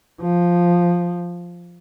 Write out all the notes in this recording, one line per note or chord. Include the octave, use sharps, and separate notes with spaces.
F3